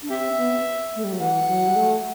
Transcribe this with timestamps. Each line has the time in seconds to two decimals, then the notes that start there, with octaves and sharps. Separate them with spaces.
0.02 D4
0.10 C4 G4 E5
0.37 B3
0.96 A3
1.04 G3
1.13 F#3
1.20 E3 F#5
1.48 F#3
1.67 G3
1.76 A3